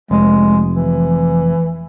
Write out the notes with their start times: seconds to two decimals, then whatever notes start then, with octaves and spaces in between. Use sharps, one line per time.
0.11 F1 G#3
0.74 E3